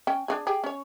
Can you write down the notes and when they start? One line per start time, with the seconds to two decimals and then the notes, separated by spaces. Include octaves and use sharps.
0.07 C#4 G5
0.28 D4 F4 G#4
0.47 G4 G#4 G5
0.64 C#4 C#5